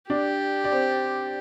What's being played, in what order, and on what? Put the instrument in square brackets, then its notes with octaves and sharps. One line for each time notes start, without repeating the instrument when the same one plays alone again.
[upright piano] D4 D5 [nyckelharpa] G4
[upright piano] D5
C4 C5